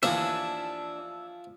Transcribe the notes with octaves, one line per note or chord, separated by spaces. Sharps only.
D#2 E3 F3 D4 E5 G#5